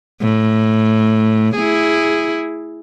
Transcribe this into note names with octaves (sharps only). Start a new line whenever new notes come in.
A2
E4 G#4